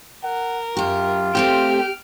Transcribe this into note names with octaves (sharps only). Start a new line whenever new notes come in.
A#4 F#5
F#2 F4 G4
A3 C4 G4 C5 F6 D7